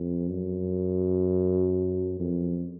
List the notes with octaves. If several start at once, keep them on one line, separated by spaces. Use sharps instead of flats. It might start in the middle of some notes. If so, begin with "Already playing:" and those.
Already playing: F2
F#2
F2